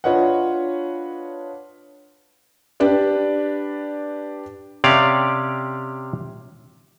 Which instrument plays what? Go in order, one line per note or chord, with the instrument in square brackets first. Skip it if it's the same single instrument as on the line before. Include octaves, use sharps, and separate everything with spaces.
[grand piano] D4 F4 B4 C#5 D#5 F#5
[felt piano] D4 G4 B4 D5
[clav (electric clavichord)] C3 C#4 G4 D5 F5